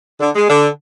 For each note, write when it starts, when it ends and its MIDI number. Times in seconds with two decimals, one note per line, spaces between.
0.20 0.29 50
0.35 0.47 56
0.49 0.68 50